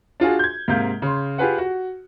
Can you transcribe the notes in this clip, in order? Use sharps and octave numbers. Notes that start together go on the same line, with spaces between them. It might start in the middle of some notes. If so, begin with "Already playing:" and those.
D4 F4 F#4 G#4
G6 G#6
G#2 C3 A#3 F5 G6
C#3 C6
F4 G4 G#4 B4 F#5
F#4